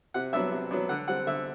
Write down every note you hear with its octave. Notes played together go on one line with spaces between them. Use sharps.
C3 F#5
F#3 B3 D4 E5
C3
F#3 B3 D4
D3 F#5
G3 C4 F#5
D3 E5